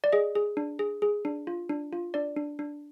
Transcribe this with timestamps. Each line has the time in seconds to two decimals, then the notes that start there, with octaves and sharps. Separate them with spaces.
0.04 D5
0.13 G#4 D#5
0.35 G#4
0.57 D4
0.79 G#4
1.02 G#4
1.25 D4
1.47 F4
1.69 D4
1.93 F4
2.14 D4 D5
2.36 D4
2.59 D4